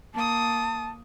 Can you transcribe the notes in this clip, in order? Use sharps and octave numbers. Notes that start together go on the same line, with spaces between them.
A#3 A5 D#6